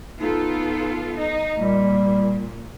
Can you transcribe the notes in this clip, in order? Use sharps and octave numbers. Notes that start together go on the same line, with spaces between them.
B3 D#4 F4 A4
D#4
A#2 G3